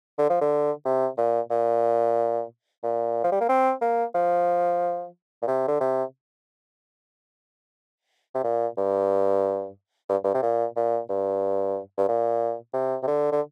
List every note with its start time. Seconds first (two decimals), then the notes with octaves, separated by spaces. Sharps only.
0.18 D3
0.30 F3
0.41 D3
0.85 C3
1.17 A#2
1.50 A#2
2.83 A#2
3.24 F3
3.32 G3
3.40 A#3
3.49 C4
3.81 A#3
4.15 F3
5.42 A#2
5.47 C3
5.68 D3
5.80 C3
8.35 C3
8.44 A#2
8.78 G2
10.09 G2
10.24 G2
10.34 C3
10.42 A#2
10.76 A#2
11.09 G2
11.97 G2
12.08 A#2
12.73 C3
13.02 C3
13.07 D3
13.32 D3